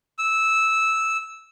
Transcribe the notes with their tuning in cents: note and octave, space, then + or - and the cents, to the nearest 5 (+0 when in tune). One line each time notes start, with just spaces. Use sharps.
E6 -10